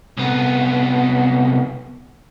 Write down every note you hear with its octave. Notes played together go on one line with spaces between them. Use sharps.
C2 B3